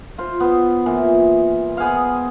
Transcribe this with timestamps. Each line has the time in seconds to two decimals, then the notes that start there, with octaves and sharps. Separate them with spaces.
0.18 F4 C5
0.40 B3 C5
0.86 A#2 E3
1.77 B3 G#4 C5 F5